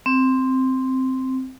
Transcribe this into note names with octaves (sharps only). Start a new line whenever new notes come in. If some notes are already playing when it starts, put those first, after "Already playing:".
C4